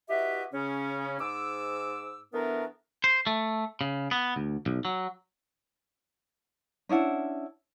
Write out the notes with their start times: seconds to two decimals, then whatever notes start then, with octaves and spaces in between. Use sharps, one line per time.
0.09 E4 F#4 G4 B4 D#5 E5
0.52 C#3 C#4
1.20 G#2 D6 E6
2.33 E3 A3 B3 D4 A#4
3.04 C5
3.27 A3
3.81 C#3
4.11 B3
4.36 D2
4.66 B1
4.85 F#3
6.89 C#4 D4 E4 F#5